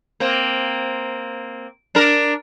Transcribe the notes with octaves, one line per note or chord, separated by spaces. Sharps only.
A#3 C4
D4 A#4